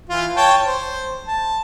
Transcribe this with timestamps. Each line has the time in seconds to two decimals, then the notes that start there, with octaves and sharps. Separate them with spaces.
0.09 E3 F4
0.36 C#5 G5 A5
0.66 C5
1.28 A5